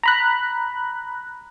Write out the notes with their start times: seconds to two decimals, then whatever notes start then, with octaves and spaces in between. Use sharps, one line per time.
0.03 A#5 B5 F#6